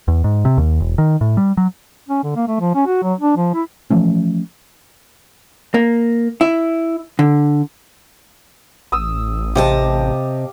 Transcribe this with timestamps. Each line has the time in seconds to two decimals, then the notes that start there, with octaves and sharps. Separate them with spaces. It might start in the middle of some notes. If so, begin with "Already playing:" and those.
0.08 E2
0.24 G#2
0.45 C3
0.58 D#2
0.80 E1
0.98 D#3
1.21 A2
1.37 G3
1.57 F#3
2.09 C#4
2.24 D3
2.36 A#3
2.48 A3
2.60 F3
2.75 C#4
2.87 F#4
3.03 F#3
3.20 D4
3.37 F3
3.54 E4
3.90 E3 F3 A3 C#4
5.74 A#3
6.41 E4
7.19 D3
8.92 A1 D#6 E6
9.55 C3 G4 D#5 F5 A5